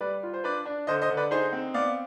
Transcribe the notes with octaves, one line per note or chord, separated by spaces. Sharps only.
G3 B4 D5
F4
C5
D4 B4 D5
D4
D3 C5 D#5
C5 D#5
D3
B4 D5
D#4 G#4 C5
C4
B3 D5 F5